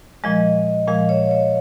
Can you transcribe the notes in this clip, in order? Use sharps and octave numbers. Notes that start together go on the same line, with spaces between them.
A#2 F3 G#3 D#5
A#2 F3 G#3 F5
C#5
C#5